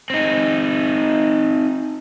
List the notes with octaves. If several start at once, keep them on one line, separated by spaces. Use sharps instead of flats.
C4 D#4